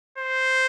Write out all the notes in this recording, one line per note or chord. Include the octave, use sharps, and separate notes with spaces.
C5